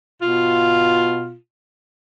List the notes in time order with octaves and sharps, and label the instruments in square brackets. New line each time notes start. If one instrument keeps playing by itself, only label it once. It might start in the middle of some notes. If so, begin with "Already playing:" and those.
[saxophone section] B2 F4